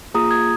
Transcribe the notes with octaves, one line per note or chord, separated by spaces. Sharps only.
A#3 F4 G#4 A#5 D#6
D#6 G#6